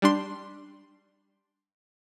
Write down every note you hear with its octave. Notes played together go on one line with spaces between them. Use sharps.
G3 D4 C6